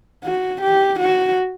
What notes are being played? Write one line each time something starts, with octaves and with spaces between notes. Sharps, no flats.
F#4
G4
F#4